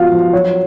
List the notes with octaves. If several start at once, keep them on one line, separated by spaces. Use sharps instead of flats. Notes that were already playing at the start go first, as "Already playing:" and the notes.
Already playing: F3 G#3 B3 F4 F#4 F5
F3
F#3 C#5